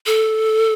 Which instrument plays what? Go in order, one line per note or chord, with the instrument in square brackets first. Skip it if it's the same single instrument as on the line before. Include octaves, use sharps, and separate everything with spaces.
[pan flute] A4